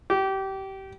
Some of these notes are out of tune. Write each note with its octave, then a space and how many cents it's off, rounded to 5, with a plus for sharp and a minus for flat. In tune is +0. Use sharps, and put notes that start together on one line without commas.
G4 -25